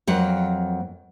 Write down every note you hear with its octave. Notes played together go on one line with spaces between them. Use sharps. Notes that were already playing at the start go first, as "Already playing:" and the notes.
F2 F#3 A#3 F#5